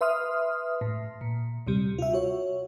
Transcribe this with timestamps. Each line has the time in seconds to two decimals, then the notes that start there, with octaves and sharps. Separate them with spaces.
0.01 B4 E5 C6 D#6 F6
0.81 A2
1.21 A#2
1.67 D2 C3 G3
1.98 F4 E5
2.13 F#4 C#5